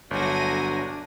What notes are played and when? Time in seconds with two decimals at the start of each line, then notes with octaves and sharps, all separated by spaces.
0.11 G1 F#3 A3 D4 G#5 A#6